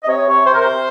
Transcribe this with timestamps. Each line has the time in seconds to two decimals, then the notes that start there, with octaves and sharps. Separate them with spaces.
0.03 D#5
0.07 C3 C#5
0.27 C3 C#5
0.45 C3 C5
0.54 A#4
0.61 C3 C5